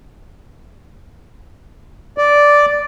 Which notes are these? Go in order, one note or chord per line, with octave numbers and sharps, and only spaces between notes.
D5